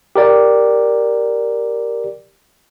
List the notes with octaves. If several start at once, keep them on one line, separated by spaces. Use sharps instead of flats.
G4 A#4 D5 G5